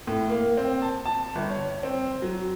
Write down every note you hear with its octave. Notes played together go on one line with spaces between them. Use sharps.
A2
A#3
C4
A5
A5
G1
C#5
C4
F#3